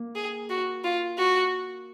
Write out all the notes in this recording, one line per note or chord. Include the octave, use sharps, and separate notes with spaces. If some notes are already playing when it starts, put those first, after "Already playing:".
Already playing: A#3
G#4
F#4
F4
F#4